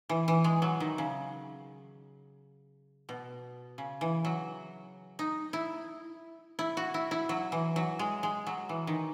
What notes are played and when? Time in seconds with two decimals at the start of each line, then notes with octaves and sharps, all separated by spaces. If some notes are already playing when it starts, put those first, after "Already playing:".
0.09 E3
0.28 E3
0.44 G#3
0.62 F#3
0.80 D#3
0.98 C#3
3.09 B2
3.78 C#3
4.01 E3
4.25 F#3
5.19 D#4
5.53 E4
6.59 E4
6.77 F#4
6.94 E4
7.11 E4
7.29 F#3
7.52 E3
7.76 F#3
7.99 G#3
8.23 G#3
8.47 F#3
8.69 E3
8.87 D#3